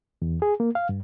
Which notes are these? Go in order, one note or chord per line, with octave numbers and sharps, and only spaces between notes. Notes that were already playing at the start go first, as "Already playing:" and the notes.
E2
G#4
A#3
F5
G2